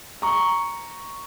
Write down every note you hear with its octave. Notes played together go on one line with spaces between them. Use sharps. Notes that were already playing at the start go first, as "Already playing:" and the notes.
A#5 C#6